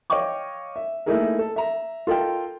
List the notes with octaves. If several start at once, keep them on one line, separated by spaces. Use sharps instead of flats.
C#5 D#5 F5 G5 C#6 D6
E5
A3 A#3 D#4 E4 G#4 A#4
A4
E5 A#5
F4 A4 A#4 D#5 G5